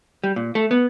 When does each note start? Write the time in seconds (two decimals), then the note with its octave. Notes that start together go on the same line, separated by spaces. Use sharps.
0.23 G3
0.36 A#2
0.55 A3
0.71 B3